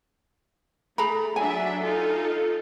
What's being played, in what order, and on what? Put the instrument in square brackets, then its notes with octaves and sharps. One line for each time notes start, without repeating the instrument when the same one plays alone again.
[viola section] A3 [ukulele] G#4 A#5 B5
[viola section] F#3 D4 E5 [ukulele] G#5
[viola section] D#4 F4 A4